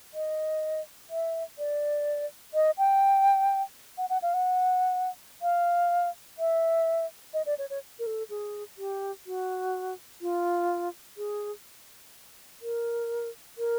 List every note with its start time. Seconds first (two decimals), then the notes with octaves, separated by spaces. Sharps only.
0.14 D#5
1.10 E5
1.58 D5
2.54 D#5
2.78 G5
3.98 F#5
4.10 F#5
4.22 F5
4.34 F#5
5.42 F5
6.39 E5
7.34 D#5
7.46 D5
7.58 C#5
7.70 C#5
7.99 A#4
8.06 A4
8.30 G#4
8.78 G4
9.27 F#4
10.21 F4
11.18 G#4
12.62 A#4
13.58 A#4